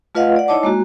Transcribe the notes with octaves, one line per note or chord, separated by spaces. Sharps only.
A3 F4 B4 D#5 F5 F#5
D5 F#5
D#4 E4 C#5 D#5 A5 D6
G#3 A#3 F#4